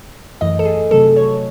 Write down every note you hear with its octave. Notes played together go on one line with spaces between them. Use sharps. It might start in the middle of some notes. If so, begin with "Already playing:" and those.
F#2 E3 A3 D#5
A4
G#4
C3 F#3 A3 A4
C#5